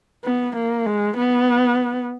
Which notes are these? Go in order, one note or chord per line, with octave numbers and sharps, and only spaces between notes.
B3
A#3
G#3
B3